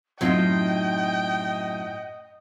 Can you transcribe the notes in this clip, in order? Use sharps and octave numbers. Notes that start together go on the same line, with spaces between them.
F#2 A2 F#3 C4 D#4 F4 D#5 G5